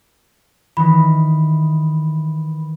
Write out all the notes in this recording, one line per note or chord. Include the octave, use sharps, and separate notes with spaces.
D#3 E3 D#4 B5